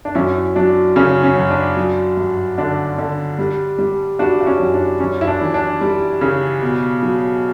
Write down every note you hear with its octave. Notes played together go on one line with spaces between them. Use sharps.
D4
F#2 C#4 E4
F#3 D4
C#3 C#4
C#4
F#2
D4
F#3
G2
D3 D4
D3
G3
G3
G3 D4 F#4
F#4
C#4 E4
F#2
D4
F#2 C#4
E4
D4
E3
D4
G3
C#3
B2
F#3